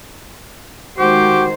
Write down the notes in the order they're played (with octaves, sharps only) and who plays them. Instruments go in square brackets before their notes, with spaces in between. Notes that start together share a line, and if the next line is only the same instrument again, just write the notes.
[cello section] D#3 G#3 C5 [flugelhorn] F#4 [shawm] G4